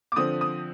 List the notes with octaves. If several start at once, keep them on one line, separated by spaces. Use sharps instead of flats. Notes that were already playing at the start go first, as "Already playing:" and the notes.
D6
D3 F3 C4 D#6
D#6